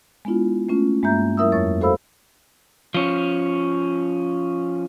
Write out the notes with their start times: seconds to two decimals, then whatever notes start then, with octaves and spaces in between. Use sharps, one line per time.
0.25 G#3 B3 D4 E4 F4
0.69 A3 C#4 F4
1.03 G2 G#3 A#3 E5 A#5 G6
1.37 F#3 E4 A#4 E5 D#6 E6
1.52 F2 C#5 C#6 A6
1.81 F#4 A4 C5 F5 B5 E6
2.94 F3 C#4